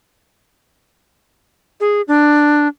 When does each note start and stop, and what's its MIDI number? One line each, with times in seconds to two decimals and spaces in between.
1.80 2.02 68
2.08 2.68 62